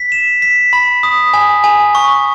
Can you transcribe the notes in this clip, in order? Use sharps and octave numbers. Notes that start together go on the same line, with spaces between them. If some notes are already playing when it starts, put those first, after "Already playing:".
Already playing: B6
E7
B6
B5
D#6
G#5
G#5
C#6